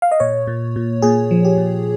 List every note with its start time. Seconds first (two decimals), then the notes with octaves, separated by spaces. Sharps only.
0.02 F5
0.11 D#5
0.20 A#2 C#5
0.47 A#2
0.76 A#2
1.02 A#2 G#4
1.31 F3
1.45 G4
1.58 A#2